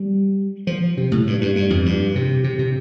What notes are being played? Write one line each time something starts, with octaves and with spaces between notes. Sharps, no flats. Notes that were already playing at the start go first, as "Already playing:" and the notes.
Already playing: G3
F3
C3
A2
G2
G2
G2
F2
G2
C3
C3
C3